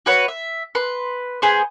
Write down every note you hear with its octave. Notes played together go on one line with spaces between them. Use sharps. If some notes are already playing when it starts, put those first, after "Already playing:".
F#4 B4 C#5
E5
B4 C6
B3 G#4 C5